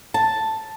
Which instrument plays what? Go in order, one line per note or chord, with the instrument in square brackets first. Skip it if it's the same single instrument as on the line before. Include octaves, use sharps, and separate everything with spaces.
[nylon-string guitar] A5